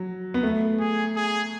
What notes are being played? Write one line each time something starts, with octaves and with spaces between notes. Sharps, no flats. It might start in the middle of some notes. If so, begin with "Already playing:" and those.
Already playing: F#3
B3
A3
G#4
G#4